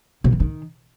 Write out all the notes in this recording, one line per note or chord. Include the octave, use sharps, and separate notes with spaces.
B2
E3
D#3